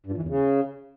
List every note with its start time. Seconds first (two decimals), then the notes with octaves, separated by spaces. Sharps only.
0.06 G2
0.12 A#2
0.17 E3
0.23 E2
0.28 C#3